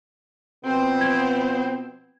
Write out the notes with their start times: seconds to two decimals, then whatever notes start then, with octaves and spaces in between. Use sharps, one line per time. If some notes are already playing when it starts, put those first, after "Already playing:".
0.65 B2 F3 B3 C4 C5
1.01 G#6